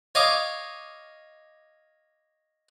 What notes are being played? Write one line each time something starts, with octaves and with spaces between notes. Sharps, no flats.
C#5 D#5 F5 D6 D#6